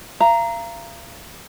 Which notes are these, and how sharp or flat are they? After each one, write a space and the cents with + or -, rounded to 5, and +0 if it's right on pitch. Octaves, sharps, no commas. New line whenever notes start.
F5 -40 A#5 +0